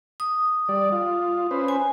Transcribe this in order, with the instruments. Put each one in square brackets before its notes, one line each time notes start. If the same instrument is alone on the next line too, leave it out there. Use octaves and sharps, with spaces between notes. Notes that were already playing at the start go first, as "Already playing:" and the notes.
[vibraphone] D#6
[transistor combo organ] G3 D5
F4
C#4 B4 C5
[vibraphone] G#5